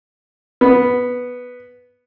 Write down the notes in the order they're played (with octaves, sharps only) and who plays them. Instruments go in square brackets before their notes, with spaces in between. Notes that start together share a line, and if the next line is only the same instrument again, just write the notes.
[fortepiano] B3